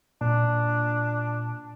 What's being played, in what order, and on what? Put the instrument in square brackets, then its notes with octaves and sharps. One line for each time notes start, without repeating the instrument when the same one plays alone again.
[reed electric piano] A#2 [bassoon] D4